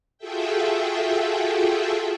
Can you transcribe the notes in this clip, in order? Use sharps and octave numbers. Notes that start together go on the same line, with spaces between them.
F4 F#4 G#4 A4 E5 G5